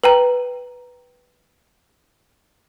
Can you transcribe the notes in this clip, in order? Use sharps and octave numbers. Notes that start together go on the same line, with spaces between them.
B4 G5 A#5